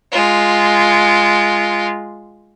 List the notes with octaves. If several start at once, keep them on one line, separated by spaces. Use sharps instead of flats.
G#3 F4